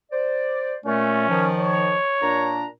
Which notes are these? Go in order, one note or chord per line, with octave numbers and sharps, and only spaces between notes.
C5 D5
A#2 A3 C#4
D#3 F3
C#5
A#2 D4 A#5